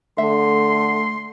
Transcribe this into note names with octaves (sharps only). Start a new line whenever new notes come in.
D3 A3 E5 C6